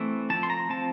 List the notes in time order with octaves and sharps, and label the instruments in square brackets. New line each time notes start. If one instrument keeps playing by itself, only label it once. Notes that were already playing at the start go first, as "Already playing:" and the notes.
Already playing: [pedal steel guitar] E3 A3 C4
F3 C4 A5
C6
A#5
F3 C4 A5